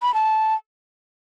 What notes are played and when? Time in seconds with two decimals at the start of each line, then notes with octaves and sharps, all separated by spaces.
0.02 B5
0.14 A5